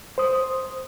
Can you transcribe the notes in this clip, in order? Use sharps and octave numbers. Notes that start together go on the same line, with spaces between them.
C5 D#6